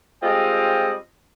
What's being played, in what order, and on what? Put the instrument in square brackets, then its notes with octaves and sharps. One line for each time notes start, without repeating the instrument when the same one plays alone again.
[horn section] G3 G#3 C4 F4 D#5 G5